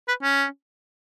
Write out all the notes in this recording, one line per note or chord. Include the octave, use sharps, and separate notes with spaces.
B4
C#4